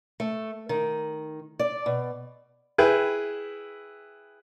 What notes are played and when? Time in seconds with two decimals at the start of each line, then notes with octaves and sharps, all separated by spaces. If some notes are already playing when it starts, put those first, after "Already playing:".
0.20 A3
0.69 D#3
1.59 D5
1.86 B2
2.78 E4 G#4 B4 G5